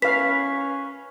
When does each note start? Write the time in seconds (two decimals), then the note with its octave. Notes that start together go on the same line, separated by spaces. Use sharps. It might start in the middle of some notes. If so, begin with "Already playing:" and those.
0.02 C#4 B4 F5 B6